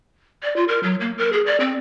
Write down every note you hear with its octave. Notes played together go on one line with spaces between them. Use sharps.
D5
F4
A#4
F#3
A#3
A#4
G#4
D5
C4